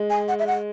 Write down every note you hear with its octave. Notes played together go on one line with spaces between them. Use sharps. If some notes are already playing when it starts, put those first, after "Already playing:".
Already playing: G#3
G#5
F#5
E5
F#5